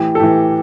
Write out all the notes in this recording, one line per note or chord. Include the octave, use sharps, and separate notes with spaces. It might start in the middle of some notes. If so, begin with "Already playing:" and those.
Already playing: A2 E3 G4
A4
A2 E3 G4